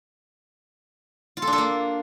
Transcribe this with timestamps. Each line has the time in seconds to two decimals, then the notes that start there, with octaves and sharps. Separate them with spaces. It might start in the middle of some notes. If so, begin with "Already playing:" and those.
1.37 F4
1.42 A4
1.47 D4
1.53 A4
1.58 A#3